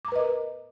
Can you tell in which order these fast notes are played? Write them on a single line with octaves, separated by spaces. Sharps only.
D6 A#5 B4 D#5 A#4